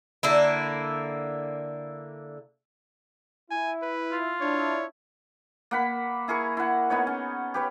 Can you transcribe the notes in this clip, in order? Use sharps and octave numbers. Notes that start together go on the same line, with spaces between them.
D3 A#3 E4
E4 G#5
B4
F4
D4 E4 C#5
A#3 F#5 B5
E4 G#4 A#4 C#6
E4 F#5
B3 D#4 C#5
C#4
G4 B4 C#5